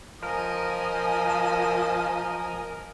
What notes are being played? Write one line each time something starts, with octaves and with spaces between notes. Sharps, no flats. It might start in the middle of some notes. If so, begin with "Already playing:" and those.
F3 A#4 D#5 G#5